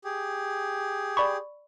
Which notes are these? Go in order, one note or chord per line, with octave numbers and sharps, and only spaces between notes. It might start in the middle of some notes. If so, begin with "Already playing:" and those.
G4 G#4
D5 B5 C#6